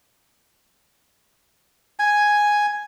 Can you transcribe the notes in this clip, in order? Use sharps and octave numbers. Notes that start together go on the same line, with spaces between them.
G#5